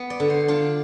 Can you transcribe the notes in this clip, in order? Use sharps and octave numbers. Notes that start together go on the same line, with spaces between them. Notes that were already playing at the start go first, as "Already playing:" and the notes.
Already playing: B3
D5
D3
C5
D4 F4